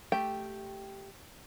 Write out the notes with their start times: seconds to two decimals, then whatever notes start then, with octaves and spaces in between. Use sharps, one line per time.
0.12 A3 G4 G5